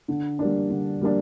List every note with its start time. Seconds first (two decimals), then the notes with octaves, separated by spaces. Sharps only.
0.08 D3
0.39 G3 A#3 D4
0.70 D3
1.01 G3 A#3 D4